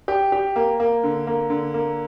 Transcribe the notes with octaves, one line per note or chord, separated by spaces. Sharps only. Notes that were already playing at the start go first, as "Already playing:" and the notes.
G4
G4
A#3
A#3
D3
A#3
D3
A#3